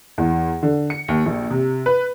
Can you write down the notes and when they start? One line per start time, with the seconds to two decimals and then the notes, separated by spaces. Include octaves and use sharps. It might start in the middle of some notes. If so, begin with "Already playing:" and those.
0.18 E2
0.63 D3
0.90 C#7
1.08 D#2
1.26 A#1
1.50 C3
1.86 B4